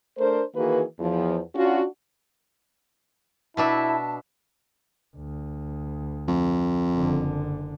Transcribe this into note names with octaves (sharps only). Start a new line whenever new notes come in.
A3 D4 A#4 C5
D#3 E3 A#3 F#4 G#4 B4
E2 F3
C#4 D4 F4 F#4
B2 D4 E4 E5 A5
D2
F2
F#1 D3